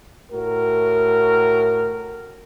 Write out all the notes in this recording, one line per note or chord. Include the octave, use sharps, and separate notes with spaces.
A2 F#4 A#4